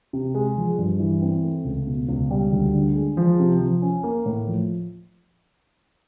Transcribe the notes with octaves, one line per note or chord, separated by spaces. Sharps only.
C3
G#3
F3
G2
E3
C4
A3
C#2
B2
C#2
G3
D2
D3
G#3
F3
C3
F3
C#4
A#3
A2
F3